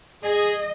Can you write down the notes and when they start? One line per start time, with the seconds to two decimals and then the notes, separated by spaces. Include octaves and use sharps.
0.23 G#4 D#5